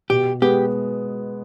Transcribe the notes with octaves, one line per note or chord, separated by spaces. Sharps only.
B2 G4
G#3 B3 G4